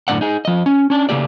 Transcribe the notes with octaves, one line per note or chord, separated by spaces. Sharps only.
F#2 A2 D3 B3 D5 F#5
D#4 G#4
F3 D#5
C#4
C#4 D4
C#3 A3 A#3 G4 D5